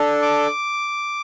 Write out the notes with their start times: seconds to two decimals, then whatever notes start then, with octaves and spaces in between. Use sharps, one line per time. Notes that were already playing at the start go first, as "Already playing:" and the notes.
Already playing: D4 A4
0.22 D6